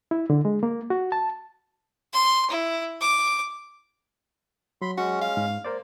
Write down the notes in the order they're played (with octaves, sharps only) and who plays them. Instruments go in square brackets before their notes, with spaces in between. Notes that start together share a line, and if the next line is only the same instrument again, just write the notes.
[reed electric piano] E4
D3
G#3
A#3
F#4
A5
[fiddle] C6
E4
D6
[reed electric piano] F#3 [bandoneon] B5 C6
[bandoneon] G#3 C#4 [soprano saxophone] F#4
[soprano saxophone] F5
[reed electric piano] G#2
[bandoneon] A#3 [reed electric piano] A#4 C5 D5